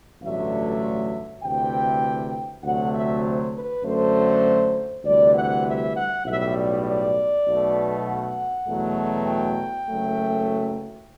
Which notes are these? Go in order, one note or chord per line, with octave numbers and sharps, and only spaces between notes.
A1 G2 D3 F#3 A3 E5
D2 C3 E3 G5
D2 C3 F#3 A3 F#5
E5
C5
B4
F#2 D3 F#3 A3 C5
D2 C3 E3 G3 D5
F#5
E5
F#5
B1 A2 G3 E5
D5
D5
B1 B2 A3
F#5
E2 B2 F#3 A3
G5
F#1 F#2 F#3 A3